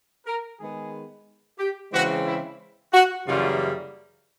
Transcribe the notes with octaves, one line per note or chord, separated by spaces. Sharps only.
A#4
D#3 G#3 B3 G#4
G4
C#3 E3 G#3 C4 F#4
E4
F#4
F#2 C#3 E3 G3 A#3 F4